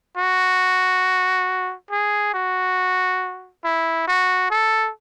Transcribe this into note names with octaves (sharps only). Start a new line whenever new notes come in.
F#4
G#4
F#4
E4
F#4
A4